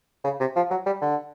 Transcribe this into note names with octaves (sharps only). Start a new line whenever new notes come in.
C#3
C3
F3
F#3
G3
D3